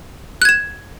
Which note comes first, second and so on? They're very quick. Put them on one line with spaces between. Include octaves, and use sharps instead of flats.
F#6 G#6 E7